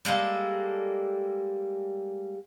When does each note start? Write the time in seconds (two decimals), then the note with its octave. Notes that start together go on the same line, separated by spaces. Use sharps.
0.05 G3 G#3 A#3 A4